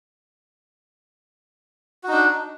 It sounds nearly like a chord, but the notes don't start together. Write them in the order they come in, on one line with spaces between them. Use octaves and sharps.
F#4 D#4 D4